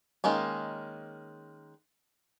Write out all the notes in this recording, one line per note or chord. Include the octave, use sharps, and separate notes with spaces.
D#3 G#3 A#3 C#4